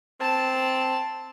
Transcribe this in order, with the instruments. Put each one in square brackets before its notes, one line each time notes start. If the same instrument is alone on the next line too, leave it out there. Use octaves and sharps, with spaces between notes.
[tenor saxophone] C4 [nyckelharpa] A5